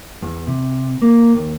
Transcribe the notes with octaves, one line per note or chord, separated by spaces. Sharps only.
E2
C3
A#3
D#2